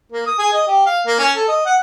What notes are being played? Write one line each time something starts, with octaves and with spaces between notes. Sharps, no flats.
A#3
D#6
G#4
D#5
G4
F5
A#3
C#4
A4
D#5
F#5